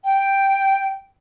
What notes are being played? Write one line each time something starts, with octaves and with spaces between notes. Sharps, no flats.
G5